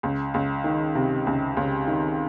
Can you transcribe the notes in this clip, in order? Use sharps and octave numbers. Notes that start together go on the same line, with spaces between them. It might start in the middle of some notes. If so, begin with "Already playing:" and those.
C#2
C#2
D#3
C3
C#2
C#2
D#3